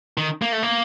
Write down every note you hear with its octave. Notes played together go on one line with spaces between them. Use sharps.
D#3
A#3
A3
A#3